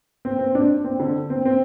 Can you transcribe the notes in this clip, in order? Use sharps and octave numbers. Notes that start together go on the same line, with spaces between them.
C4
C4
D4
C4
D3
C4
C4